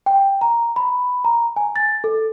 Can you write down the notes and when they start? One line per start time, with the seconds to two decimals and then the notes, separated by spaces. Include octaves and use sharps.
0.06 G5
0.41 A#5
0.76 B5
1.24 A#5
1.56 G#5
1.76 A6
2.04 A4